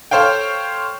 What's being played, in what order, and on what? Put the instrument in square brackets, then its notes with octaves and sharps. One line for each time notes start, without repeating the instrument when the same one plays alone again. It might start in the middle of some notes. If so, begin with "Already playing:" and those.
[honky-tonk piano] A4 C5 C#5 F5 G5